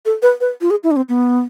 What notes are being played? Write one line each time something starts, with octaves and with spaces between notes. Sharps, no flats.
A4
B4
B4
F4
G#4
E4
D4
C4
B3